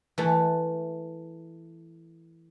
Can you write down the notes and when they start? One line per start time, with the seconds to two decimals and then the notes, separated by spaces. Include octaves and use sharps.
0.18 E3 A3